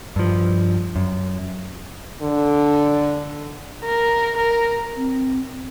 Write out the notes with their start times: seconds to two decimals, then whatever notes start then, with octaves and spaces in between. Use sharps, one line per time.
0.16 G2 F3
0.96 F#2
2.22 D3
3.85 A#4
4.37 A#4
4.96 C4